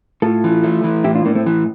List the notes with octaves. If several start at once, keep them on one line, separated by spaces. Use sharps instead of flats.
A2 F4 A4
E3
A3
E3
A2 E4 G4
D4 F4
A2 A#3 D4
A3 C4
E3